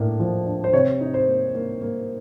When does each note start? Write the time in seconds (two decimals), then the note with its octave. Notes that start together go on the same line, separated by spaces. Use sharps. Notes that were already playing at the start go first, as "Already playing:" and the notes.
Already playing: A2 A#3 D4
0.19 F3
0.46 D4
0.64 C5
0.73 C3 C#5
1.01 D#4
1.14 C5
1.27 A#3
1.55 A#3
1.81 A#3